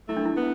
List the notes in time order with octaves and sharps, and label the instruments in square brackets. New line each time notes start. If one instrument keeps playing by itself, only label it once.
[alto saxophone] A3 [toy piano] E4
[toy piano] D4
E4
[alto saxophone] B3